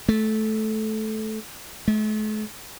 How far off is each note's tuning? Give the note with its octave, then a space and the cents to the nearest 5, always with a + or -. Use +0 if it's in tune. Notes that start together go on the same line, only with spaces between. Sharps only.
A3 -15
A3 -45